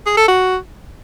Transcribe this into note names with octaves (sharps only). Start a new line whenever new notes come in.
G#4
A4
F#4